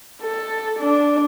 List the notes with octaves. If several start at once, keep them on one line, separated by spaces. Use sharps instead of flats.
A4
D4